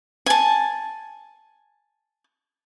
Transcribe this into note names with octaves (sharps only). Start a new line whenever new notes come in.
G#5 A5